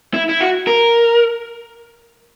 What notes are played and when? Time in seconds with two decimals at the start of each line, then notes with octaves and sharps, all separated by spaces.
0.14 E4
0.29 E4
0.41 F#4
0.67 A#4